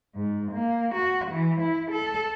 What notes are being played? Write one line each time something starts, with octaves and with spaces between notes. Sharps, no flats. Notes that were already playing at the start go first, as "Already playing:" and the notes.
G#2
A#3
F#4
E3
E4
A4